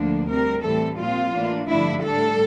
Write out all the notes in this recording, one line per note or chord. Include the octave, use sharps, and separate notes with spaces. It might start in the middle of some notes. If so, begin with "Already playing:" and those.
Already playing: D2 D3 F3 A#3 D4
C3 G3 C4 A#4
A2 E3 G3 C4 A4
A#2 F3 C4 F4
A2 E3 A#3 D4
G2 D3 F3 A3 D4 E4
A2 G3 D4 A4